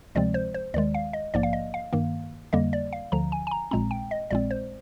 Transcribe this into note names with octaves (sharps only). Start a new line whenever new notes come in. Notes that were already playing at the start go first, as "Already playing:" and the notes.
D2 C3 F3 G#3 C4 D5
C5
C5
D#2 D#3 G#3 D5
F5
D#5
A#1 G#2 F3 A#3 D5
F5
D#5
F5
G2 D#3 A#3
F2 D3 G3 A#3 D#5
D5
F5
D2 D3 F3 A#5
G#5
G#5
A#5
A#1 A#2 G#3 C4 A#5
G5
D#5
A#1 A#2 G#3 C4 D5
C5